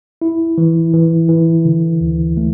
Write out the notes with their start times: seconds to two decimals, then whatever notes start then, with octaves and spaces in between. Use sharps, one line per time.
0.22 E4
0.58 E3
0.93 E3
1.29 E3
1.65 D3
2.01 D2
2.37 A3